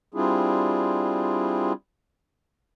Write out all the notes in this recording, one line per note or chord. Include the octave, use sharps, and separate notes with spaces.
G3 C4 D4 E4 F4 G#4